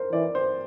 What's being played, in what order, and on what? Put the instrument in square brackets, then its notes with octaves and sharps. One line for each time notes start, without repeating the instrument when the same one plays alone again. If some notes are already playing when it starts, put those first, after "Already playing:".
Already playing: [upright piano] A#4 C5
[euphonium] E3 [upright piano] D5
[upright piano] C5